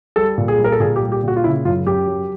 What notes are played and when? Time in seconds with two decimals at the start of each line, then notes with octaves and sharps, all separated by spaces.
0.16 G3 A4
0.38 A#2
0.48 G#4
0.59 G3
0.64 A#4
0.72 A4
0.80 A#2 G#4
0.96 G4
1.02 G3
1.12 G4
1.23 A#2 F#4
1.36 F4
1.44 C#3 E4
1.65 F#2 F4
1.86 F#2 G4
2.07 F#3